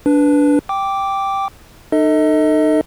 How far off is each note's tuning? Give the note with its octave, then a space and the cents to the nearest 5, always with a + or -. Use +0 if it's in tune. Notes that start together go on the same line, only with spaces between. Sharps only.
D4 -15 B4 +0
G5 +0 D6 -5
D#4 -35 A4 +20 D#5 +30